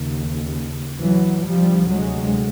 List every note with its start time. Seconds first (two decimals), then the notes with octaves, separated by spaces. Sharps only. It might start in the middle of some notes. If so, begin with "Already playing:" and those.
Already playing: D#2 C#3
0.99 E3 F#3
1.45 D2 C3 F3 G3
1.91 F#3 G#3